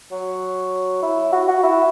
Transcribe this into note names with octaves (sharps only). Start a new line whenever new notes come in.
F#3
E4
F#4
F#4
E4